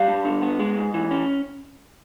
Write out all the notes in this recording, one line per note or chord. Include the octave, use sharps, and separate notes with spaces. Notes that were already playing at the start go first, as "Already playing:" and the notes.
Already playing: G3 F5
G2
D3
B3
G#3
G#2
E3
C#4